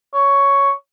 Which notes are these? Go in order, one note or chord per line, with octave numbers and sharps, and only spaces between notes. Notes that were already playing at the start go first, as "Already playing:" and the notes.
C#5